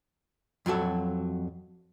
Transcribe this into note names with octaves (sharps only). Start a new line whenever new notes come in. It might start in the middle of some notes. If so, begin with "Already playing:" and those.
F2 F#3 F#4 A4